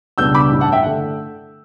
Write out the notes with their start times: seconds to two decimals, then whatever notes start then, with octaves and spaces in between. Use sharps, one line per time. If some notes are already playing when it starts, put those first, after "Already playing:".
0.18 C#2 B2 G3 B3 D4 E6 G6
0.35 B5 D6
0.50 A1 G2 E3
0.61 F#5 A5
0.72 E5 G5
0.83 F#5
0.86 D3 A3